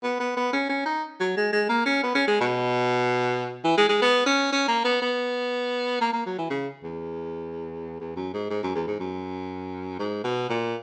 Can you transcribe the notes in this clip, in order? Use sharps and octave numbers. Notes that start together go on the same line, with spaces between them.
B3
B3
B3
C#4
C#4
D#4
F#3
G#3
G#3
A#3
C#4
B3
C#4
G#3
B2
E3
G#3
G#3
B3
C#4
C#4
A#3
B3
B3
A#3
A#3
F#3
E3
C#3
E2
E2
F#2
G#2
G#2
F#2
E2
G#2
F#2
G#2
B2
A#2